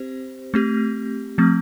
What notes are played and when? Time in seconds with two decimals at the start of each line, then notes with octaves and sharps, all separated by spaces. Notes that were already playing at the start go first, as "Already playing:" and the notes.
Already playing: C4 G4 C5
0.54 A3 C4 G4
1.38 F3 A3 C4